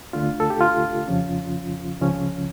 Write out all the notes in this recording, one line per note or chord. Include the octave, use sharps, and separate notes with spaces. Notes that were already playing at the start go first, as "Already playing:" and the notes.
D2 D3 A3 D4 F4
A4
G4
F4
F2 C#3 F3 C#4
C#2 C#3 F3 C#4